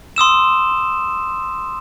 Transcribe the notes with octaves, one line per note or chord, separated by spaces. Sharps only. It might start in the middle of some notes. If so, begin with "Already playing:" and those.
C6 D#6 E6 E7